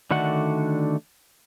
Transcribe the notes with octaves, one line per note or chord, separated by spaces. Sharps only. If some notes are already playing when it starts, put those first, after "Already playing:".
D3 D#3 A3 D4 F#4 F#5